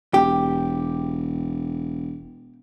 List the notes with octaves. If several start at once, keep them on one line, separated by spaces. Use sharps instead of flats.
E1 G4